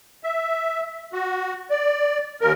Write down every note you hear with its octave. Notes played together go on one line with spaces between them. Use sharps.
E5
F#4
D5
D#2 A#4